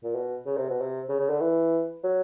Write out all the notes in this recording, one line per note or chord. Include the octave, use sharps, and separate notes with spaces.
A#2
B2
C#3
C3
B2
C3
C#3
C#3
D3
E3
F#3